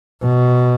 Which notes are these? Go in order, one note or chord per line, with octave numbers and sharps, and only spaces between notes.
B2